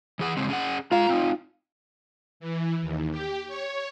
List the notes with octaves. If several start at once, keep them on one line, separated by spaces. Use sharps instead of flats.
E3 G#4 F#5
C#3 G#3 C4
C#4 G#4 F#5
G#3 F4 F5 A#5
C4 D#4
E3
D#2
G4
C#5